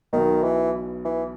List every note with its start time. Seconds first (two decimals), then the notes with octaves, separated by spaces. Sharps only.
0.13 B1 B2 D#3
0.44 E3
1.05 E3